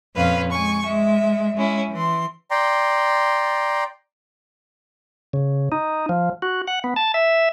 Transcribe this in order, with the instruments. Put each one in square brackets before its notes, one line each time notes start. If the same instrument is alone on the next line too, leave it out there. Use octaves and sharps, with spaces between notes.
[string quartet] F2 A#2 C#4 B4 F5
G#3 G#5 C#6
G#3 E5
G#3 C#4 E4
E3 C6
[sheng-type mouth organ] D5 G5 A#5 C6
[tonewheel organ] C#3
D#4
F3
F#4
F#5
B3
A5
E5